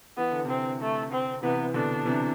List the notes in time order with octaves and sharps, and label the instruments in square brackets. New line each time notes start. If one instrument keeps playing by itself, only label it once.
[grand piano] E3 [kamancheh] B3
[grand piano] D3
[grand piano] C3 E3 [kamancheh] C4
[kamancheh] A3
C4
[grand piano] C3 E3 [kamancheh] B3
[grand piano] C3
[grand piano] B2 D3 [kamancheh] D4
[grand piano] C3 E3